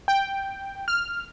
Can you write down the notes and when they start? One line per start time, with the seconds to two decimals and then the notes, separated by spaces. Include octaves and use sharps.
0.08 G5
0.88 F6